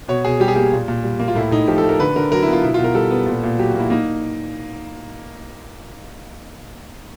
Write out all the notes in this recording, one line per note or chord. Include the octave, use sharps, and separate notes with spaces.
B2 C#5
B2 G#4
G3 G4
G#4
A#3 G4
A#2
A#2
G3
A#3
F4
A2 E4
A2 D#4
F3 G4
A4
A3
A#4
D3 B4
D3 A#4
F#3 A#4
E4
B3
F4
B2 E4
F4
B2
A#4
G3 A4
B3
A#2
A#2
F#3 G4
F#4
A#3 E4
A#3 D#4